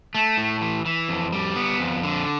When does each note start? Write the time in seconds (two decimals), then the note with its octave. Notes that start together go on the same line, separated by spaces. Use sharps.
0.15 A3
0.37 A2
0.61 E3
0.85 E3
1.09 F2
1.33 G3
1.56 B3
1.80 F2
2.03 D3